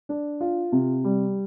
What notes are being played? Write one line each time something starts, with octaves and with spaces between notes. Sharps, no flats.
D4
F4
C3
G3